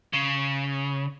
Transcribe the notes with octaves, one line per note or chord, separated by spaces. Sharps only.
C#3